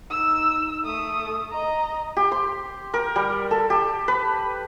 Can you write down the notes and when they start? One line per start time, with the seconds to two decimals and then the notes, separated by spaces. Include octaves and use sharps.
0.10 D#4 E6
0.85 A3 D#6
1.51 D#5 A#5
2.16 G4
2.32 C6
2.94 A#4
3.16 G3
3.51 A4
3.70 G4
4.08 B4